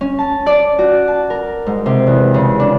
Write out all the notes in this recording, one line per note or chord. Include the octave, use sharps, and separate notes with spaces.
C#4
A5
D5
F#4
A5
A#4
G#2
C3
E2
C#3
D4